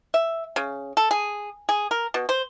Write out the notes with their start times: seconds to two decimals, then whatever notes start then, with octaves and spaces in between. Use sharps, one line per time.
0.14 E5
0.56 C#3
0.97 A4
1.11 G#4
1.69 G#4
1.91 A#4
2.14 B2
2.29 C5